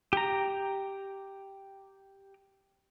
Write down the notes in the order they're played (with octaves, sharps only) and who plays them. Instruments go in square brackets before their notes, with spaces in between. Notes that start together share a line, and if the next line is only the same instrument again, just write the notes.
[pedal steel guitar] G4 A#5